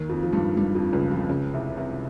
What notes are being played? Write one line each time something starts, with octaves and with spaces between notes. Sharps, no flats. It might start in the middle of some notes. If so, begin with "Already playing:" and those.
Already playing: D#2 D#3
F2 F3
F3
G2 G3
G2 G3
F2 F3
C#2 C#3
F2 F3
C#2 C#3
C2 C3
C2 C3